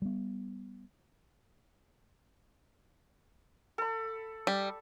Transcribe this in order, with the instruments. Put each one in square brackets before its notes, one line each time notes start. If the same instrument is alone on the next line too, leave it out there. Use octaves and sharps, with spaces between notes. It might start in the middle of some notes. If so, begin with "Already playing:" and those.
[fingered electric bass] G3 B3
[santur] A4 B5
[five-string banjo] G3